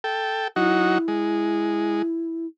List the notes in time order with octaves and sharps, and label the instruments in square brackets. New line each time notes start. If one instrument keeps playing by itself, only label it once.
[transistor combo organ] A4 G5
[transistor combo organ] F#3 D#4 F#4 [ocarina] E4
[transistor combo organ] G#3